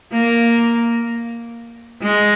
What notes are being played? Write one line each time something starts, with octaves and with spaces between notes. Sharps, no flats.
A#3
G#3